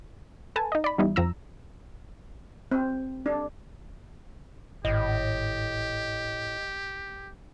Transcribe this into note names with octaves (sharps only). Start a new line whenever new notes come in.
A4 B4 G#5 A5
D#4 D#5
D5 B5
E2 G3 D#4 E4
F2 F3 A#5 E6
C4
D4
G#1 A2 G4 D#5